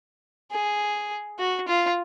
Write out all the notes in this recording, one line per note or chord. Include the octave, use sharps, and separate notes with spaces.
G#4
F#4
F4